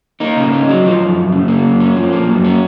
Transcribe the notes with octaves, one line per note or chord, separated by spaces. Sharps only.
A#3 D#4
C#3
C#4
F#3
F3
F#2
F#2
C#3
A#3
F#2
C#4
F3
A#3
F#2
C#4